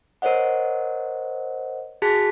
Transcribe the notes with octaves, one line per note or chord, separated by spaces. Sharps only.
A#4 C5 C#5 D#5 F#5
F#4 G#4 A5 F#6 B6